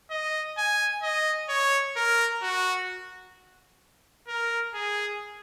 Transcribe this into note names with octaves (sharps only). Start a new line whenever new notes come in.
D#5
G#5
D#5
C#5
A#4
F#4
A#4
G#4